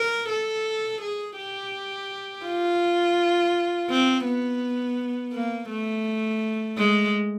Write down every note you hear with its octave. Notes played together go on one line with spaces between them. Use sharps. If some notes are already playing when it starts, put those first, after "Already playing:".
Already playing: A#4
A4
G#4
G4
F4
C4
B3
A#3
A3
G#3